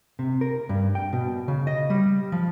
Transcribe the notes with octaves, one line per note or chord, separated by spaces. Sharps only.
C3
A#4
G2
G5
B2
C#3
D#5
G3
F3